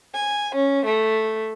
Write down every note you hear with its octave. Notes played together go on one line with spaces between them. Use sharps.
G#5
C#4
A3